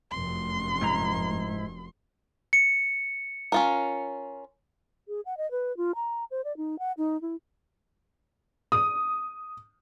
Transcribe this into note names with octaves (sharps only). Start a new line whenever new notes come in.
F1 F#2 C6
G#2 E4 A#5
C#7
C#4 F4 A#4
G#4
F#5
D#5
B4
F4
A#5
C5
D5
D#4
F#5
D#4
E4
D#6